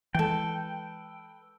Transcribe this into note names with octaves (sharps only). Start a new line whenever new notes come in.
E3 G#3 A4 B4 G5